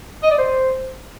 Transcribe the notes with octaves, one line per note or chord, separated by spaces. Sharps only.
D#5
D5
C5